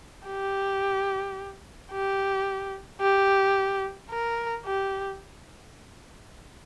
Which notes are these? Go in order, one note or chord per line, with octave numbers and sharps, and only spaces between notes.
G4
G4
G4
A#4
G4